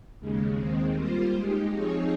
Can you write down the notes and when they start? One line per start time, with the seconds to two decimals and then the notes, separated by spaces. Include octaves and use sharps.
0.19 D#2 C#3 G#3
0.57 D#2 D#3 G#3 C4
0.94 G3 A#3 F4 C5
1.32 G#3 D#4 G4
1.70 F3 C4 D#4 G#4 C#5